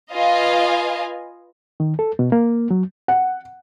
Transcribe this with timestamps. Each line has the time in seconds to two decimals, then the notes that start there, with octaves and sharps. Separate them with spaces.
0.12 F4 B4 D#5 F5 G#5
1.80 D#3
1.99 A4
2.19 B2
2.32 A#3
2.71 F#3
3.08 F#5